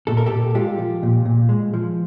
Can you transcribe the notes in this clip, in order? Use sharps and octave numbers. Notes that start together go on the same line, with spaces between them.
A#2 A4
A#4
G4 A4
A#2
G#3 F4 G4
F3
A#2
A#2
G#3
F3